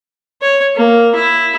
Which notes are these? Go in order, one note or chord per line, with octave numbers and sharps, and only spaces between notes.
C#5
A#3
E4